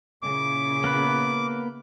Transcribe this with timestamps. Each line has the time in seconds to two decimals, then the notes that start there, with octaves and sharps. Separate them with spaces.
0.23 A#2 C#3 E4 D6
0.84 A#3 B3 B4